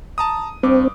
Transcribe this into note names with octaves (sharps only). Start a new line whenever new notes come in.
A5 A#5 D#6
G2 C4 D6